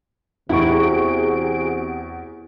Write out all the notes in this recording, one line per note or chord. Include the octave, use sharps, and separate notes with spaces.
E2 C3 E4 F#4 G#4 C#6 D7